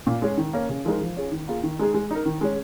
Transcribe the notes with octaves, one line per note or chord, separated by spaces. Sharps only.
A#2
G#3 C#4 G#4
D#3
A#3 C#4 A#4
C#3
F3 G#3 D#4 A#4
F3
C#4 F4 G#4
D#3
A#3 F4 G#4
D#3
G#3 D#4 G#4
G#3
D#4 A#4
D#3
G#3 C#4